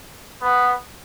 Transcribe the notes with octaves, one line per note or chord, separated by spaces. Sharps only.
B3